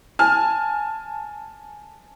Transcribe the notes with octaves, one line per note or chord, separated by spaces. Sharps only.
G#5 A5 F6